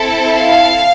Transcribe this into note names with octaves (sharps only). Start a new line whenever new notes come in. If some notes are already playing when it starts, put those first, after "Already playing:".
Already playing: C4 E4 A4
F5